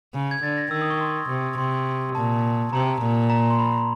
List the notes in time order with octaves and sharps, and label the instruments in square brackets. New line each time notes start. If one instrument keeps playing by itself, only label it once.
[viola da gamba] C#3
[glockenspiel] G#6
[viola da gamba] D3 [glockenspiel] A6
[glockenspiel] A#6
[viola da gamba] D#3 [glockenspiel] E6
[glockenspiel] D#6
C#6
C6
[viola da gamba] C3
[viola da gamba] C3 [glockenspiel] C6
[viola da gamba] A#2 [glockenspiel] A5
[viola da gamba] C3 [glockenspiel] A#5
[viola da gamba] A#2
[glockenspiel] A#5
C6
B5